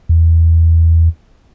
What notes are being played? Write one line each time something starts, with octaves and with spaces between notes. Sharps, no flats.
E2